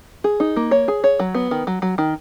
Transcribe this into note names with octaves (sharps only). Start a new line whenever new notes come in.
G#4
D#4
A#3
C#5
G#4
C#5
F#3
B3
D#3
F#3
F#3
D#3